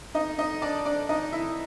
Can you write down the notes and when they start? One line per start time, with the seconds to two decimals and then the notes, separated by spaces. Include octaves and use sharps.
0.15 D#4 D#5
0.38 D#4 D#5
0.62 D4 D5
0.85 D4 D5
1.09 D#4 D#5
1.32 E4 E5